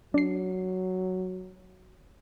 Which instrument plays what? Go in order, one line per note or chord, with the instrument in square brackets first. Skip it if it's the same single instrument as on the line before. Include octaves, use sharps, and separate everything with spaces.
[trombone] F#3 [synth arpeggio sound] D4 C7